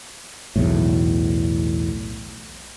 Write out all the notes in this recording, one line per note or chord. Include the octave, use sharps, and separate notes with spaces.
B1 E2 A2